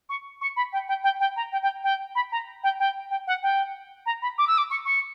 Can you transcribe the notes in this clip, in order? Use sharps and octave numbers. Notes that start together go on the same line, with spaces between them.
C#6
C#6
B5
G5
G5
G5
G5
A#5
G5
G5
G5
B5
A#5
G5
G5
G5
F#5
G5
A#5
B5
D6
E6
D6
C#6
C#6